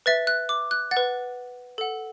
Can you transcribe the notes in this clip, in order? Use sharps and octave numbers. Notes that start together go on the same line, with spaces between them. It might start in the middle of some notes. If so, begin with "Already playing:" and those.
B4 E5 A6
F#6
D6
F#6
F#5 A6
B4
A4 F#5